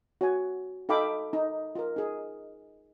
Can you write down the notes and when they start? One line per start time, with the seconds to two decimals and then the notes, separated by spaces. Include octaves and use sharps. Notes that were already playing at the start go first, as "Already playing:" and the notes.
0.21 F#4 C#5 G#5
0.89 D#4 A4 F5 G5 B5 D6
1.33 D#4
1.75 F4 A#4
1.96 D#4 G#4